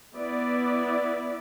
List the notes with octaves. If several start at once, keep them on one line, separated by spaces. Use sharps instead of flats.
B3 E4 D5